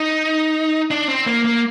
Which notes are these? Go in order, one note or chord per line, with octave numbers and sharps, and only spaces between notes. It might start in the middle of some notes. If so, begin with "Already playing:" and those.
Already playing: D#4
D4
C4
A#3
A#3